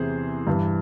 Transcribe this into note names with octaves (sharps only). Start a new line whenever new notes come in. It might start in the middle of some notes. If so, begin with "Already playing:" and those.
Already playing: E2 C3 E3 G#4 C5
G2 E3